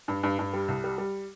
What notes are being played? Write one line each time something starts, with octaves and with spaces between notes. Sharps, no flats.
G2
G2
G2
G3
C2
G3
G3